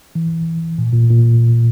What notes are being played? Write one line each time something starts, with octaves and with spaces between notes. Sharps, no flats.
E3
A#2
A#2
A#2